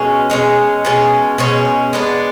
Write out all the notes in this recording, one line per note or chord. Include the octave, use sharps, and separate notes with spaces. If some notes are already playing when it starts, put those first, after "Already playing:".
Already playing: B2 G#3 C#4
B2 G#3 C#4
B2 G#3 C#4
B2 G#3 C#4
G#3 B3 D4